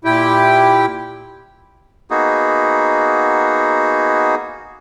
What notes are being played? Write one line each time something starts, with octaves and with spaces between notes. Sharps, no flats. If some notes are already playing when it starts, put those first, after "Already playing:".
A#2 E4 G4 G5
A#3 B3 D#4 F#4 G#4